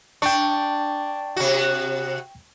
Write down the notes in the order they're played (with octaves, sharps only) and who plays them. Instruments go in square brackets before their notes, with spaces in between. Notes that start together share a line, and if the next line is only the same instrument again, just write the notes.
[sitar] D4 [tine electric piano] G5 C#6
[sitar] C3 F#4